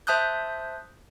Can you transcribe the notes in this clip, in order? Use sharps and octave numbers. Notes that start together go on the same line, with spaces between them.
C5 E5 A5 D#6 F#6 G6